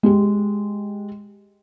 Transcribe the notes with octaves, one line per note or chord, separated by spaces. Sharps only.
G#3 G4